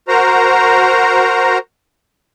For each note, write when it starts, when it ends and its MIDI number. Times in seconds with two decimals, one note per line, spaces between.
0.08 1.58 66
0.08 1.58 70
0.08 1.58 72
0.08 1.58 82